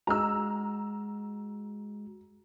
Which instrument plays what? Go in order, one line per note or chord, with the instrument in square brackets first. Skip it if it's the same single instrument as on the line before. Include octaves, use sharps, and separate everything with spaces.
[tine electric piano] G#3 F#4 [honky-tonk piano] A#5 E6